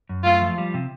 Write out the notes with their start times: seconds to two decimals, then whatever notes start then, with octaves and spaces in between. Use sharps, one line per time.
0.09 F#2
0.25 A3 F4
0.42 F3
0.58 G3
0.74 C3